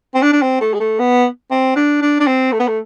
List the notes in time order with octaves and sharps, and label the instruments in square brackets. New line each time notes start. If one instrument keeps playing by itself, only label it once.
[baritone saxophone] C4
D4
D4
C4
A3
G#3
A3
B3
C4
D4
D4
D4
C4
A3
B3
A3